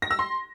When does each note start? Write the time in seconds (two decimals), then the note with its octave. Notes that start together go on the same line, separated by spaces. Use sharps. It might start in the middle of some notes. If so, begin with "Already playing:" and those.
0.02 A#6
0.11 E6
0.19 C6